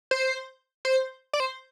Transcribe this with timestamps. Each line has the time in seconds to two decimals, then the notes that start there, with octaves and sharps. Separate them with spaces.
0.11 C5
0.85 C5
1.33 D5
1.40 C5